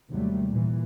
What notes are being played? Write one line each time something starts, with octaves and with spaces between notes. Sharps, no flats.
D#2 C3 F#3 G3 A3
A#2 E3